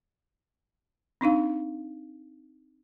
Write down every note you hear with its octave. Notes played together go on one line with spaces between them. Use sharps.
C4 D4 D#4 F5